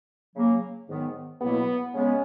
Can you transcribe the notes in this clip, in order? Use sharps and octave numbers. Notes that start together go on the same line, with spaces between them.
C#3 F#3 A#3 C#4
G#2 D#3 F#3 B3
C#2 B2 F#3 A#3 B3 E4
C#3 G#3 B3 C#4